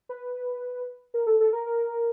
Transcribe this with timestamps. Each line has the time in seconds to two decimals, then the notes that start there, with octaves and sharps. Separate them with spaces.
0.09 B4
1.14 A#4
1.27 A4
1.40 A4
1.53 A#4
1.66 A#4